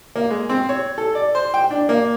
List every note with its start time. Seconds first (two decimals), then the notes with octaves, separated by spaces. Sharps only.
0.16 A#3
0.30 G#3
0.49 C4
0.69 C#5
0.98 A4
1.15 D5
1.35 C5
1.54 G5
1.71 D4
1.89 A#3